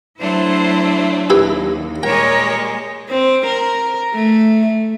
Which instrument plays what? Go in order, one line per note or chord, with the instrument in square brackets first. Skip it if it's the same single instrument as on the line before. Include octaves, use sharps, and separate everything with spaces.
[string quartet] F#3 A3 D4 [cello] E4 C5
[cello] D#2 [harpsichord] E4 G4 B4
[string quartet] A#2 G3 G#3 [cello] A#4 C#5 [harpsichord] G5
[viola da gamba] C4
A#4
A3